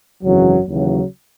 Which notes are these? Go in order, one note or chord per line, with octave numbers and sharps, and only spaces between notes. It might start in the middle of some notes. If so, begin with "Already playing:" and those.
G#1 F#2 C#3 E3 F#3
D#2 C#3 E3 F#3